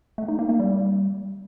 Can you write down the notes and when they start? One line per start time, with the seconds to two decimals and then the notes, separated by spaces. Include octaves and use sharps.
0.18 A3
0.28 D#4
0.39 A#3
0.49 A#3
0.60 G3